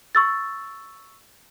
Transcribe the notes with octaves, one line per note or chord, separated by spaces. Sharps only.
C#6 E6 A6